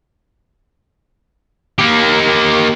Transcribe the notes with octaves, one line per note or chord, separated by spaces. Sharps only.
A#3 G4